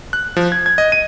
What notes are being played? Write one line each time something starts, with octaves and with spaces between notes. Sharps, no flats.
F#6
F3
G#6
G#6
D#5
D#7